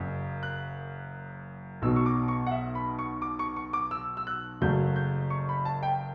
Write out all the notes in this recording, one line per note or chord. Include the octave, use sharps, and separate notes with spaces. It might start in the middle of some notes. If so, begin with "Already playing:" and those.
Already playing: F#1 F#2 C#3
F#6
B1 B2 F#3 E6
C#6
D6
C#6
F#5
E5
B5
C#6
D6
C#6
C#6
D6
E6
E6
F#6
F#1 F#2 C#3 F#3 A3 G6
G6
C#6
B5
A5
G5